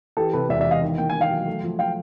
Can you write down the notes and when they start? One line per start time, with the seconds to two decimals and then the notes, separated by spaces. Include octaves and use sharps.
0.17 E3 G4 A4
0.33 C3 A4 B4
0.49 E1 D5 E5
0.61 D5 E5
0.66 E2 D#5 F5
0.82 D#3
0.98 A#3 G5
1.10 G#5
1.15 D#3
1.21 F5 G5
1.30 F#3
1.48 A3
1.63 F3
1.79 F5 G5